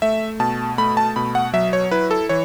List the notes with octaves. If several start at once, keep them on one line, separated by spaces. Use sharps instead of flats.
A3 E5
B2 A5
A3 B5
A5
B2 B5
F#5
F#3 E5
C#5
E4 B4
A4
E3 C#5